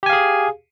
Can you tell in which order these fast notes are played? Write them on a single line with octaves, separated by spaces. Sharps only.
G4 G#5 F5 G#4